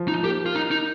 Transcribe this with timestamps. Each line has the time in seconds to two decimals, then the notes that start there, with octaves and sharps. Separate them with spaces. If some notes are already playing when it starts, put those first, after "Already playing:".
Already playing: F3
0.08 D#4
0.23 A#3 G4
0.46 F4
0.55 D#4
0.71 D#4